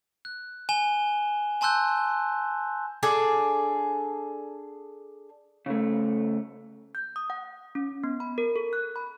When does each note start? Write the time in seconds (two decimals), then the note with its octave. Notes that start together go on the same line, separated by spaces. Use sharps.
0.25 F#6
0.69 G#5 E7 G7
1.61 G#5 A5 C6 E6 F#6 G6
3.03 D4 G#4 A4
5.66 C#3 A3
6.95 G6
7.16 D#6
7.30 F#5
7.75 C#4
8.04 B3
8.20 B5
8.38 A#4
8.56 A4
8.73 F#6
8.96 B5